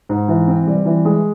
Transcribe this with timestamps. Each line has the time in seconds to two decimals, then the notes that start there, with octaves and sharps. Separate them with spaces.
0.09 G#2
0.28 E3
0.47 C4
0.67 G3
0.86 E3
1.05 G#3